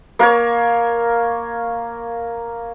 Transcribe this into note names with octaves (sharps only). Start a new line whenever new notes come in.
A#3 A#4 C#5